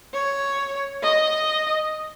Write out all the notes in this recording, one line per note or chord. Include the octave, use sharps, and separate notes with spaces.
C#5
D#5